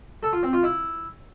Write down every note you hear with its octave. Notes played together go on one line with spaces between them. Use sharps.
A4
F4
C4
F4
E4